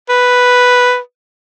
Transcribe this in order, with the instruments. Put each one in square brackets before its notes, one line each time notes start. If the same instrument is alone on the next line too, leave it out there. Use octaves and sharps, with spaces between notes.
[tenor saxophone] B4